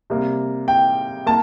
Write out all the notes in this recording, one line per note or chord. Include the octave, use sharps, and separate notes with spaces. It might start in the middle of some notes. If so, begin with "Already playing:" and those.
C3 G3 A#3
G5
A#3 A5